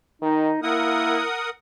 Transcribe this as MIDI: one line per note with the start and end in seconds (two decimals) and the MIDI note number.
0.22 0.51 51
0.22 0.58 63
0.63 1.21 58
0.63 1.22 64
0.63 1.50 70
0.63 1.50 78
0.63 1.50 87